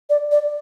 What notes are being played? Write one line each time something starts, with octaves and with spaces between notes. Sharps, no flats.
D5
D5